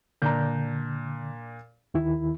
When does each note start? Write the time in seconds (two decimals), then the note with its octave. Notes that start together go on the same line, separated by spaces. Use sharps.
0.22 A#2 D3 D4 A#5 G6
1.94 D#2 D#3 E4